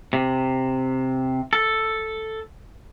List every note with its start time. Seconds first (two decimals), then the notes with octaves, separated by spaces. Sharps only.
0.13 C3
1.53 A4